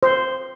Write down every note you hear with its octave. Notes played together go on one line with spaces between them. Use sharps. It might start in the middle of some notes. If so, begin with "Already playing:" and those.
C5